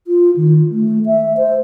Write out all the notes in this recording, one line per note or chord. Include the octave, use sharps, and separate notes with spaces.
F4
D#3
A3
E5
C5